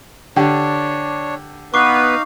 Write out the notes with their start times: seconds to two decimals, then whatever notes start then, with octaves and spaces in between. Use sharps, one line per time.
0.36 D3 D4 G4 C#5
1.74 B3 D#4 B4 F5 C#6 D6 C7